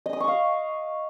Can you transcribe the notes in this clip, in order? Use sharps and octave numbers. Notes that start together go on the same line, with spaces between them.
D#5
D#6
C#6
F5